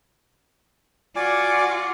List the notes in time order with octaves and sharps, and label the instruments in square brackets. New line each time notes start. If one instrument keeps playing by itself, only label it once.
[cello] F4 F#4 [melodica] D5 G#5 D6